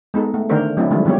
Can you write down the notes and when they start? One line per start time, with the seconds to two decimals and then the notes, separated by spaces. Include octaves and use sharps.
0.14 G#3 B3 D#4 A4
0.34 A3
0.49 D3 D#3 A3 D4 A#4 C5
0.77 F#3 A3 C4 D4 E4
0.91 D3 E3 F3 G3 G#3 E4
1.05 D#3 F3 G3 B3 G4 C#5